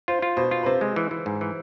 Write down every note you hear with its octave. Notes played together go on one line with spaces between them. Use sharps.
F4 C5
F4
B2 C5
F4
B4
C3 C5
G#3
E3
E3
G#2
E3